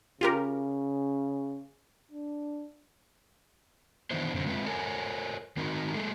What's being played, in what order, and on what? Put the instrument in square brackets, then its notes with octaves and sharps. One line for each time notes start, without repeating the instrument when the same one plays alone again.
[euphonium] C#3 [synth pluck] F4 G4 A#4
[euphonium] D4
[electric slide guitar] D#3 E3 B3 D4 E4 C5
F#2 D3 C4
G#3 C4 F4 B4 D#5 E5
A4 A#4 C#5 G#5
D#3 C4 D#4 F#4 A#4
F#3 G#3 A3 G#4 A4